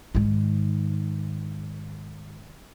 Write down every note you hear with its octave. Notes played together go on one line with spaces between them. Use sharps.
G#2 D#3